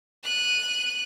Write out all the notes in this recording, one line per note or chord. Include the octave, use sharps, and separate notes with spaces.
F#6 D#7